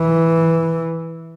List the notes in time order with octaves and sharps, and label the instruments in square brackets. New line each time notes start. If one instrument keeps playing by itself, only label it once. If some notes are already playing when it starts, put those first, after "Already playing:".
Already playing: [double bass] E3